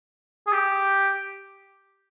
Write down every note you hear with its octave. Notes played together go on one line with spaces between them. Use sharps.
G#4
G4